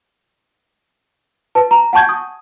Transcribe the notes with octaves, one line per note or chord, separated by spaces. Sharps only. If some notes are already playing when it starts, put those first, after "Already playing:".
B4 A5
A#5
F#5 G#5 A5 C#6 G6 G#6
D#6